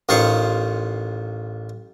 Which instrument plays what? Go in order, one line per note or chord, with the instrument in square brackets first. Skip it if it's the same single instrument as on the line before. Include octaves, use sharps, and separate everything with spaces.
[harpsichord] A1 D#3 F4 C5 C#6